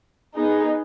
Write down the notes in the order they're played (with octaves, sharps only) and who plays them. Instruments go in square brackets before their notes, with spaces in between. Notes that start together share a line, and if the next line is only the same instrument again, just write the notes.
[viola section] B3 D#4 G#4